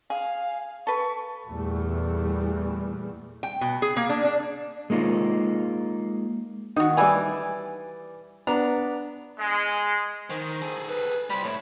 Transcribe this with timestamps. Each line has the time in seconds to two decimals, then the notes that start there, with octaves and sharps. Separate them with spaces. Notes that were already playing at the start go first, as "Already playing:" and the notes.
0.10 G#4 F5
0.87 A4 B4 C#6
1.48 E2 A#2 G3 A3
3.43 G5
3.61 B2
3.82 G#4
3.97 A#3
4.09 D4
4.24 D4
4.90 G#3 A#3 D#4 F4
6.76 D#3 D#4 F#4
6.97 E3 G3 D5 G#5 E6
8.47 B3 D4 A#5
9.39 G#3
10.30 D#3 C5
10.62 G#4 A4
10.89 B4
11.30 G3 C5 B5
11.44 A2 E4 C#5